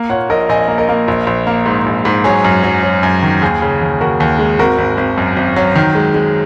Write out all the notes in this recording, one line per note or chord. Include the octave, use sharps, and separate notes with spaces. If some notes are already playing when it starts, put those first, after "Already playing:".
Already playing: A#3
A#2 C#5 F#5
A#1 A#4 D#5
A#1 D#5 G#5
A#3
A#4 D#5
A#3
A#1
A#1
A#3
G#2
A#1
G#2
F#3 G#4 C#5
F#2
F#3
F#3
F#2
D#3
D#2 G#4
C#3
D#2
D#2 F#4 A#4
D#2
G#3
G#1 F#4 A#4
G#1
G#1
F#2
G#1
F#3
D#3
G#3
G#3